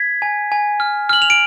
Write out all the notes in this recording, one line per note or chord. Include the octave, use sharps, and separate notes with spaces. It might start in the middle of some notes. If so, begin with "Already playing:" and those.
Already playing: G#6 B6
G#5
G#5
F6
F6 F#7
F7
D7